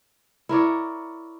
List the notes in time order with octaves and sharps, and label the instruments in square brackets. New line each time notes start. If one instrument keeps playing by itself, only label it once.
[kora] E4 A#4 C#5 D5